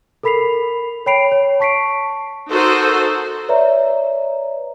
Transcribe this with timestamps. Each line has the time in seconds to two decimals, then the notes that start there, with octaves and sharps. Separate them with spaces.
0.23 A4 A#4 B5 B6 C7 F7
1.06 C#5 G5 B5 C7 D7 F7
1.32 C#5
1.60 A5 C#6 B6 C7 D7
2.50 D#4 F#4 A4 A#4 C5
3.49 B4 C#5 D5 E5 A#5